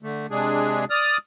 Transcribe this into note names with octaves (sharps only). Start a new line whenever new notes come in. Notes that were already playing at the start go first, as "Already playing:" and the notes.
D3 A3
C3 G#3 D4 G#4
D5 D#6 F6